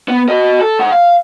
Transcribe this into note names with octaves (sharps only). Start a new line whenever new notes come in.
B3
F#4 D#5
A4
G#2 F#5
F5